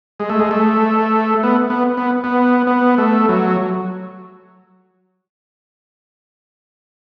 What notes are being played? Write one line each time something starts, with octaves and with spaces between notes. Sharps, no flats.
G#3
A3
G#3
A3
B3
B3
B3
B3
B3
A3
F#3